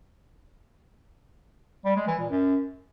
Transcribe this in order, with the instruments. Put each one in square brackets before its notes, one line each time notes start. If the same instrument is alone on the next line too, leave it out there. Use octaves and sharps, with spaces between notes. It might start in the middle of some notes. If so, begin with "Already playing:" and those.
[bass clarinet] G3
G#3
E3
A#2
F#2